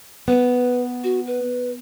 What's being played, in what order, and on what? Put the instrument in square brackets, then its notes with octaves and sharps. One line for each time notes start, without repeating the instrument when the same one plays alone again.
[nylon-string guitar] B3 [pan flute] B4
[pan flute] F#4
B4